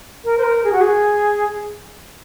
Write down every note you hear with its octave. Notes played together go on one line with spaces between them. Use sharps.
A#4
C5
A#4
G#4
F#4
G#4